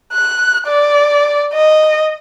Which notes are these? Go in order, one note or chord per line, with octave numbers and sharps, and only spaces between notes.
F#6
D5
D#5